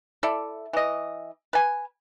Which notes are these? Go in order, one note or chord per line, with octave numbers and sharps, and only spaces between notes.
E4 A4 D5
E3 D#5
B4 G#5